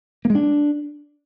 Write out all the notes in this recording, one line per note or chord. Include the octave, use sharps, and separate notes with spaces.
A#3
G#3
D4